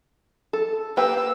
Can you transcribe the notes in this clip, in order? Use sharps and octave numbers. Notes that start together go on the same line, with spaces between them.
A4
A#3 G4 B4 E6